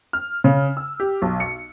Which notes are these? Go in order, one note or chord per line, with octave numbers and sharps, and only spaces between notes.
F6
C#3
E6
G4
B1
C#7